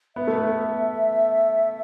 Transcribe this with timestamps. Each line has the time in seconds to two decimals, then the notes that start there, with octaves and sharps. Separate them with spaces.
0.16 B3 E5
0.27 A3
0.38 B3